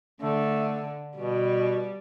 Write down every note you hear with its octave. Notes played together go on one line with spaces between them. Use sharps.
D3 A3
B2 G3